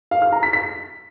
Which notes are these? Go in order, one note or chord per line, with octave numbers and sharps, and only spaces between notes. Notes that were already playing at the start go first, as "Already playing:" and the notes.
F5
F6
A#5
B6
B6